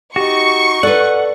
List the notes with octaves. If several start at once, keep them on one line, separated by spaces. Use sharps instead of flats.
D#4 F#4 G4 C#6
A4 B4 D5 F#5